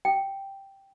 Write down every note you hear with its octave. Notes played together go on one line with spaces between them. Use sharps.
G5